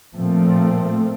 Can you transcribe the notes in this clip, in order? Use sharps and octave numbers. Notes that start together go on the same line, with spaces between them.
A#2 F3 A3 C4